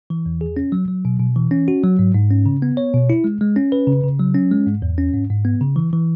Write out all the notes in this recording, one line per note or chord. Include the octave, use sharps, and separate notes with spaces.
E3
E2
G#4
C#4
F#3
F#3
B2
B2
E3
C#4
F#4
F#3
G#2
G#2
C#4
C#3
B3
C#5
B2
E4
G#3
G#3
C#4
B4
C#3
C#3
F#3
C#4
G#3
G#2
E2
C#4
G#2
G#2
B3
C#3
E3
E3